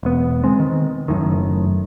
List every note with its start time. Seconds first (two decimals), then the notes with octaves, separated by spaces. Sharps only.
0.03 E1 B3
0.44 D#3 G#3 C4
0.60 D#3
1.08 F#1 F#2 A2 D#3